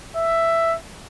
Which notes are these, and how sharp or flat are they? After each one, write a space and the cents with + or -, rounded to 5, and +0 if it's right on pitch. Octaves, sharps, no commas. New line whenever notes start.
E5 +5